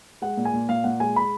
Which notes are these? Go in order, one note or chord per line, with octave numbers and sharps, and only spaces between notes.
G#3 F#5
A#2
G#5
A#2
A#2 F5
A#2 F#5
G#3 G#5
B5